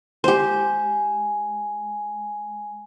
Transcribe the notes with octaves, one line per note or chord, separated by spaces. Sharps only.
G#3 G4 C5 G#5